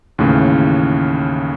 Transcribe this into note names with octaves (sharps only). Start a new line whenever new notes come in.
D#2 A2 C#3 E3